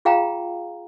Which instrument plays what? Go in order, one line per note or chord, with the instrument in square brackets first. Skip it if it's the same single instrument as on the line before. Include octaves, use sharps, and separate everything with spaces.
[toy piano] F4 G#4 F5 G5 A#5